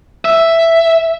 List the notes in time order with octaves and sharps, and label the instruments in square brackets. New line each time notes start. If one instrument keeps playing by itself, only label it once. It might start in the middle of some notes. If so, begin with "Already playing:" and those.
[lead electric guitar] E5